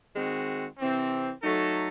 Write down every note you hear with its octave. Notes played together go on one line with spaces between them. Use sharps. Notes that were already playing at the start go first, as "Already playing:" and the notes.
D#3 G#3 C4 F#4
C3 E3 C4
F#3 A3 D#4 A4